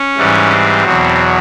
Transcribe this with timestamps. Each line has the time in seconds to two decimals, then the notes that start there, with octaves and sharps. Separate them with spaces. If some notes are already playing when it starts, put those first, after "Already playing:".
Already playing: C#4
0.17 G#2 E3 G3
0.50 C4
0.84 E2 B2 F#3